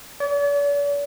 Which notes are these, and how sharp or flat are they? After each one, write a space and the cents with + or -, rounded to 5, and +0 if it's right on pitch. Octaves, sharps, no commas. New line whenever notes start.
D5 -45